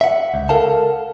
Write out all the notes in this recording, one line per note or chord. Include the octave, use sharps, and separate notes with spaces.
E5 F#5
C#2
A4 A#4 F5 F#5 A5